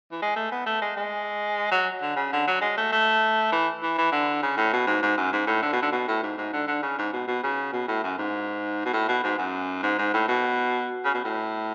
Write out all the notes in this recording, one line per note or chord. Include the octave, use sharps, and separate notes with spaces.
E3
G#3
A3
B3
A3
G#3
G#3
F#3
D3
C#3
D3
F#3
G#3
A3
A3
E3
E3
E3
D3
C#3
A2
B2
G#2
G#2
F#2
G#2
A2
D3
B2
D3
B2
A2
G#2
G#2
D3
D3
C#3
G#2
B2
B2
C#3
B2
A2
F#2
G#2
B2
A2
B2
G#2
F#2
G#2
G#2
A2
B2
C#3
B2
A2